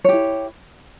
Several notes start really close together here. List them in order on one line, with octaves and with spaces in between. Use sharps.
C#5 G4 E4